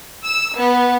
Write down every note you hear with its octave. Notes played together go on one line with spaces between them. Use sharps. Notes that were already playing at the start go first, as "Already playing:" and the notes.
E6
B3